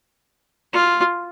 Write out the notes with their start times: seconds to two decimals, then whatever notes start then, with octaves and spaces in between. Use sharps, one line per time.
0.73 F4